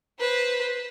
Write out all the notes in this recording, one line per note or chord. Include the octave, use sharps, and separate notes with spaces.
B4 C5